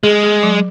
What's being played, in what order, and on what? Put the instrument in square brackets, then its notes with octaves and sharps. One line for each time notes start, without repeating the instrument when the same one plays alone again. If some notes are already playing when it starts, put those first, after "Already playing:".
[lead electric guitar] G#3 [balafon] G#4
[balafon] G#4
F#3